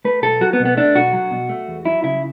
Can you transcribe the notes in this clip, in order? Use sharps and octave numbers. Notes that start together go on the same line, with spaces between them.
A3 B4
B1 A4
F#3 F#4
B3
B2
B3
A3 D4
B1 F#4
F#3
B2
A3
E2
F#3 E4
C#3 E4